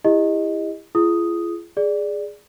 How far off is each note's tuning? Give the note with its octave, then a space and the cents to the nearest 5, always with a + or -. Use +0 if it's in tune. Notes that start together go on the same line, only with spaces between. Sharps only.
E4 +0 G4 +40 D#5 +0
F4 -40 G#4 +20 D#6 +0
G#4 +0 D5 +0